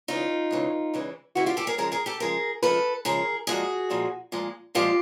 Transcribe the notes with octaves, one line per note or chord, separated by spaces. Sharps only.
C#3 E3 G#3 D#4 F4
C#3 E3 G#3
C#3 E3 G#3
C#3 E3 G#3 E4 F#4
F4 G4
G4 A4
G#4 A#4
C#3 F3 G#3 G#4 A#4
G#4 A#4
G4 A4
C#3 F3 G#3 G#4 A#4
C#3 F3 G#3 A4 B4
C#3 F3 G#3 G#4 A#4
A#2 F3 G#3 F#4 G#4
A#2 F3 G#3
A#2 F3 G#3
A#2 F3 G#3 F4 G4